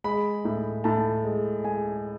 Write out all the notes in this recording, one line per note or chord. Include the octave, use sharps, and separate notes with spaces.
G#3 B5
A2
A2 A5
G#3
G#3 G#5